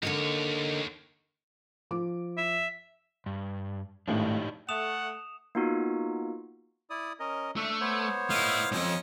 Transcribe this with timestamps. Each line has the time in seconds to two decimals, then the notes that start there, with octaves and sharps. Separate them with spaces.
0.03 D#2 D3 A#4 C#5 D#5
1.91 F3 D6
2.38 E5
3.26 G2
4.08 G#1 A2 D4 D#4 G4
4.69 A3 F#5 D#6 E7 F7
5.55 A#3 B3 D#4 F4 F#4
6.90 E4 D5 D#6
7.20 C#4 A#4 D#5
7.56 A3 D4 E5 C#6
7.81 B3 C5 C#5
8.30 A3 E4 D#5 F5
8.72 F2 G#2 C#4 D#5